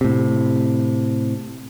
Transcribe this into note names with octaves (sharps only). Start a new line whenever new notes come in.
A2 C3